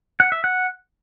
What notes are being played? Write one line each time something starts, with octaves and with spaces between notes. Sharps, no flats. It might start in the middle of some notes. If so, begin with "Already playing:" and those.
F#5
E5
F#5